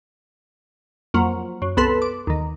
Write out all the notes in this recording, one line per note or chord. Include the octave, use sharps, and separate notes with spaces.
F2 F#3 A#3
F#2
C2 B3 A4 B4 C6
D6
D#2 D#3